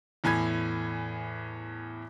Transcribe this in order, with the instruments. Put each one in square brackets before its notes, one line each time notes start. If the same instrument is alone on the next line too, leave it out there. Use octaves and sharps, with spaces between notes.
[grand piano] E2 A2 G#5 B5 G#6